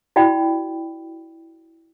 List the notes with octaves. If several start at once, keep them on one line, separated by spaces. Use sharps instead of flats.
E4 F#4 D5 G5 B5